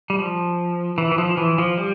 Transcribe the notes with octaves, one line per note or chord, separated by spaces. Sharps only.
G3
F3
E3
E3
F3
E3
F3
G3